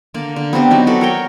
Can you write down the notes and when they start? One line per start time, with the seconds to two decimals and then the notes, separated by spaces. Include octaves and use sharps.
0.14 D3 A#3 D5
0.36 D3
0.53 B3 C4 D4 G4
0.71 F#3 B3 D#4
0.87 F#4 A4 B4 D5
1.01 A#4 C#5 G5